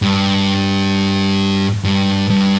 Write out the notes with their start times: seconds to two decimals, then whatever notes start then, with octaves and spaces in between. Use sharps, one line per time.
0.02 G2
1.84 G2
2.30 G2